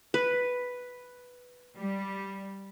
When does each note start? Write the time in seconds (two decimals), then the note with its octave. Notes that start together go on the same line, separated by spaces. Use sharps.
0.14 B4
1.77 G3